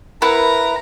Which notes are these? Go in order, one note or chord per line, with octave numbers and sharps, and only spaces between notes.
E4 A#4 B4 F#5 A#5